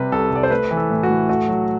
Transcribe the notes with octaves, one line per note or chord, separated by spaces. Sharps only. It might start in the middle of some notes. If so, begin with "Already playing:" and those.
Already playing: C3 G3 B4
C2 A4
C2 D5
C5
A3 B4
E3
A4
A2
F#4
A2
A3 F#4
F#3